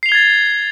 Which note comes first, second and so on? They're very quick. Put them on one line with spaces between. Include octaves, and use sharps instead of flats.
C7 F7 G7 G#6 A6